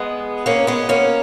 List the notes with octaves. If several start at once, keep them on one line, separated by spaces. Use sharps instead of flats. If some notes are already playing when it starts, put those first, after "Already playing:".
Already playing: G#3 B3
A#3 C#4
G#3 B3
A#3 C#4